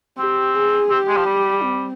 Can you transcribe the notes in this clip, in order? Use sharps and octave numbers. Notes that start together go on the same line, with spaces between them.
C4 G4
G#4
C4 G4
G#3
F3
G3
C4